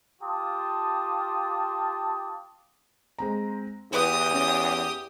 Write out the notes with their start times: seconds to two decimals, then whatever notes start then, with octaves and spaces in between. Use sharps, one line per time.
0.22 F4 G4 A5 D6 D#6
3.19 G#3 C4 A#5
3.92 E2 E4 G4 B4 D#6
4.34 C#4